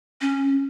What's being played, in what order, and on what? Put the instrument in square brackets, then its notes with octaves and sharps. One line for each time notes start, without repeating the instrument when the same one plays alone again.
[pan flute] C#4